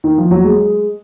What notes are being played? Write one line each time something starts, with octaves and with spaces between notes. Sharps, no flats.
D#3
F3
F#3
G#3